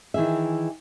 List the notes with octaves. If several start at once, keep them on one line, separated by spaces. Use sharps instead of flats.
D#3 E3 G#3 G#4 E5